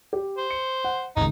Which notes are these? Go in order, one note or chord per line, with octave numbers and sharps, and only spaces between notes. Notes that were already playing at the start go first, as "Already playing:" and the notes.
G4
C5
C#7
F#5
G#1 C#2 D#4